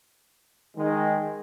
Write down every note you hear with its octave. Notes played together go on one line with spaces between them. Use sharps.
D#3 G#3